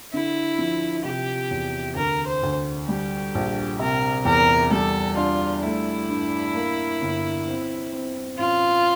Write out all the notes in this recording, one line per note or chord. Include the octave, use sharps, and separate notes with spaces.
D3 E4
F3
C3 G4
E2
D2 A#4
C5
D2
G3 G4
A#1
C3 A#4
E2 A#4
G3 A4
D4 F4
A3 E4
G2
A#3
G1
C4
C4
A1 F4